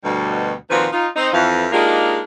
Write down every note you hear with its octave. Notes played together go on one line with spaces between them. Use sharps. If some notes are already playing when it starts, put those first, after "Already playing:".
D2 B2 G3
A#2 D#3 F3 C4 F#4 B4
D#4 F4
C4 D#4
F2 E3 F5
G#3 A#3 D4 D#4 F4 G4